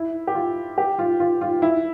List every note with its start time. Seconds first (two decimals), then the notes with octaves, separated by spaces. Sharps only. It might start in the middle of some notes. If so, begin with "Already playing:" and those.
Already playing: E4
0.27 G4
0.35 F4
0.78 G4
0.99 F4
1.20 F4
1.41 F4
1.62 E4